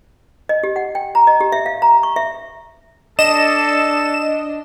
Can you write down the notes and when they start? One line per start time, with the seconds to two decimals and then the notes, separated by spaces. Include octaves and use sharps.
0.49 D#5
0.63 G4
0.76 F#5
0.95 G5
1.15 A#5
1.27 D#5
1.41 G4
1.52 E5
1.66 F5
1.82 A#5
2.03 C#6
2.16 E5
3.19 D4 A4 D#5 E7